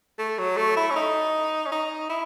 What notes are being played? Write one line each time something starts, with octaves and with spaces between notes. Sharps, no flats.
A3
F#3
A3
E4
C#4
D#4
C#4
D#4
E4